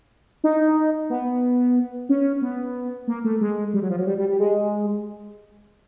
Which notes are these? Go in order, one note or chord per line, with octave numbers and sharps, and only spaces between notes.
D#4
B3
C#4
B3
A#3
A3
G#3
G3
F#3
F3
F#3
G3
G3
G3
G#3